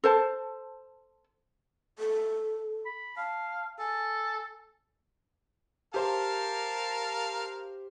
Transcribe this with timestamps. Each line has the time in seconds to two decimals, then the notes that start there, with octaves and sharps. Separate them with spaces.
0.04 A4 C5 A5
1.99 A4
2.85 B5
3.17 F5 A5
3.79 A4 G#5
5.94 G4 A#4 C5 F5 A5